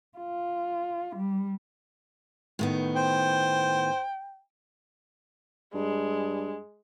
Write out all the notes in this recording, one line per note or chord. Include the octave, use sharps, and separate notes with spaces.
F4
G3
A2 D#3 B3
C5 G5
G2 G#3